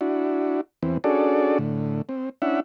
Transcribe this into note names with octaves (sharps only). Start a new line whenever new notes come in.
D4 E4 F#4
E2 E3 C4
C#4 D4 F#4 G#4 A4 D5
A2 D3
C4
C#4 D4 E4 E5 F#5